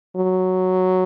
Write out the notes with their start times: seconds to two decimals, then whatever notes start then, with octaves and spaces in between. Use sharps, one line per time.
0.16 F#3